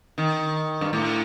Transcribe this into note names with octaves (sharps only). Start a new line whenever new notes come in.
D#3
G2
A2